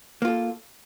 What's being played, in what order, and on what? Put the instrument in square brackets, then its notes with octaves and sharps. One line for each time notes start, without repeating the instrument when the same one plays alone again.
[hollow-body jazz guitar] A#3
F4
A4